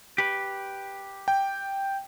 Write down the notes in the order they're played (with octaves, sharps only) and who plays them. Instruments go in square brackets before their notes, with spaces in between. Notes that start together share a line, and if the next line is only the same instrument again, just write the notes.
[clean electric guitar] G4 B4
[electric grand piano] G5